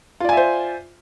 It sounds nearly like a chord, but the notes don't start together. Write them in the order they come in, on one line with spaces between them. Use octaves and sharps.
F4 D5 G#5 E5 C5